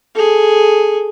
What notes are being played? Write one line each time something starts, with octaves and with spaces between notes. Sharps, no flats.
G#4 A4